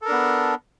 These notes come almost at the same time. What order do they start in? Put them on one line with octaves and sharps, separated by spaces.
A4 A#4 D4 B3